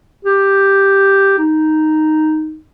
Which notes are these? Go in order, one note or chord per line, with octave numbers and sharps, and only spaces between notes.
G4
D#4